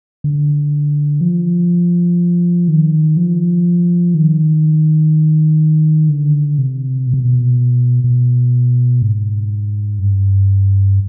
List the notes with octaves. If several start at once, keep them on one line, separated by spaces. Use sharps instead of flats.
D3
F3
D#3
F3
D#3
D3
C3
B2
C3
B2
B2
G#2
G2